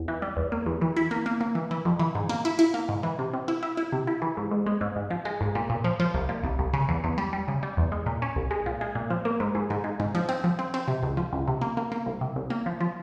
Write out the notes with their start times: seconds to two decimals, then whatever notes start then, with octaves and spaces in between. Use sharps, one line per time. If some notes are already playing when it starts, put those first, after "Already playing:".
Already playing: E2
0.08 E3
0.22 G3
0.37 E2
0.52 A#3
0.66 E2
0.81 E3
0.97 E4
1.11 A#3
1.26 A#3
1.41 A#3
1.55 E3
1.71 E3
1.85 F2
2.00 E3
2.15 G#2
2.29 A#3
2.45 E4
2.59 E4
2.74 A#3
2.89 G#2
3.03 E3
3.19 C3
3.33 C3
3.48 E4
3.63 E4
3.77 E4
3.92 C3
4.07 E4
4.22 E3
4.37 G#2
4.51 G#2
4.66 G#3
4.81 G#2
4.96 G#2
5.11 F3
5.25 G#3
5.41 G#2
5.55 A#2
5.70 A#2
5.84 F3
6.00 F3
6.14 C2
6.29 A#2
6.44 C2
6.59 C2
6.73 C#3
6.89 E2
7.04 E2
7.18 G3
7.33 G3
7.48 C#3
7.63 G3
7.77 E2
7.92 G#3
8.06 A#2
8.22 C#4
8.36 C2
8.51 G#3
8.66 A#2
8.81 G#3
8.95 A#2
9.10 F3
9.25 A#3
9.40 G#2
9.55 G#2
9.70 G#2
9.84 G#2
10.00 G#2
10.15 F3
10.29 C4
10.44 F3
10.59 C4
10.74 C4
10.88 C3
11.03 C#2
11.17 F3
11.33 C#2
11.48 C3
11.61 A#3
11.77 A#3
11.92 A#3
12.06 C2
12.21 C3
12.36 C2
12.50 A#3
12.66 F3
12.81 F3